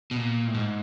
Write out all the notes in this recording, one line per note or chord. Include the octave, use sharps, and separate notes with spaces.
B2
A#2
A2
G#2